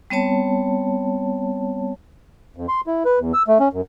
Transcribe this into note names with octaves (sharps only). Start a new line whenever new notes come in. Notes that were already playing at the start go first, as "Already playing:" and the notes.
G3 B3 C4 C#5 A5
F2
C6
E4
B4
E2
E6
A3
C#4
F#2